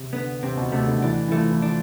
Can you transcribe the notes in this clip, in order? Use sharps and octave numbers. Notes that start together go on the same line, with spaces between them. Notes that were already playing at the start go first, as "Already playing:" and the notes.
Already playing: C3
D3 B3
C3 C4
B2
C3 A3
D3
E3 D4
E3
F3 A3
E3
F3 D4